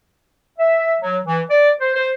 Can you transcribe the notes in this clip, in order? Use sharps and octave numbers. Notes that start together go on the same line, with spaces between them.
E5
F#3
E3
D5
C5
C5